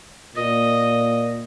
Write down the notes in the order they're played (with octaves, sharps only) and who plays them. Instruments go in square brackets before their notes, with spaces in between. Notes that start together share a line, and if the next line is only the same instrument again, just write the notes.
[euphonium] A#2 [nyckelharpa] D#5